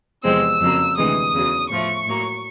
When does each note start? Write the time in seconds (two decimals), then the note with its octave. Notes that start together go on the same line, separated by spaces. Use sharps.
0.24 E2 C3 F3 G#3 C4 E6
0.60 F2 C#3 F#3 A#3
0.97 D2 C3 E3 G#3 B3 D#6
1.33 E2 C#3 F#3
1.69 A2 F3 A3 C#6
2.06 A2 F#3 A#3